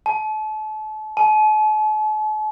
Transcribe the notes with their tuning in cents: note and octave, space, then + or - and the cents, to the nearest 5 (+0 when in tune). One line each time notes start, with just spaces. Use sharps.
A5 -35
A5 -45